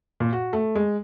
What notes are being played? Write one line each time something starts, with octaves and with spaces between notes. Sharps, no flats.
A#2
F#4
A3
G#3